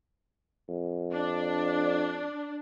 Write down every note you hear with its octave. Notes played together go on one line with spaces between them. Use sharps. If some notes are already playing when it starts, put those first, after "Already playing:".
F2
D4